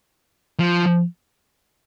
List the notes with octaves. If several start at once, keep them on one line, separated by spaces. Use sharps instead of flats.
F3